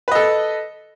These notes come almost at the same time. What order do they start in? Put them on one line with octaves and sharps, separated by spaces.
B4 D#5 A4